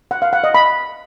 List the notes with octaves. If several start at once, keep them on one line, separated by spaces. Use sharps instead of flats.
F#5
F5
F#5
D#5
B5